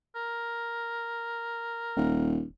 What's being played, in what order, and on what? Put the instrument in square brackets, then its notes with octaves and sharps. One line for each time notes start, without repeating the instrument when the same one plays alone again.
[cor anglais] A#4
[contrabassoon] D#1